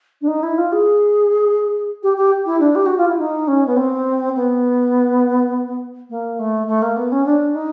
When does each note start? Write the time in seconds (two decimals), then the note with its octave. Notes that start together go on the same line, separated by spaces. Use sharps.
0.22 D4
0.28 D#4
0.43 E4
0.58 F4
0.72 G#4
2.03 G4
2.17 G4
2.46 E4
2.60 D4
2.75 G4
2.86 F#4
2.97 F4
3.08 E4
3.19 D#4
3.48 C#4
3.67 B3
3.77 C4
4.35 B3
6.10 A#3
6.39 A3
6.67 A3
6.82 A#3
6.96 B3
7.12 C#4
7.25 D4
7.55 D#4